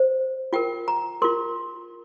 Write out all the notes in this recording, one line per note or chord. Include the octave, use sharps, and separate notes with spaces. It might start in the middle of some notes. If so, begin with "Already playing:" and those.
Already playing: C5
F4 A#4 G5
A#5
F4 A#4 C6